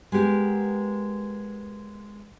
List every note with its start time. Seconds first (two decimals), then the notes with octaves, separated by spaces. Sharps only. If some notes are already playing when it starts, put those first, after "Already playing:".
0.12 G#3 B3 G4 A#4